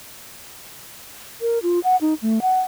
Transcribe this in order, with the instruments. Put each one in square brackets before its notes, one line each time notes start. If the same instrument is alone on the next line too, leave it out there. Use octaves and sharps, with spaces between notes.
[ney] A#4
F4
F#5
D#4
A3
F#5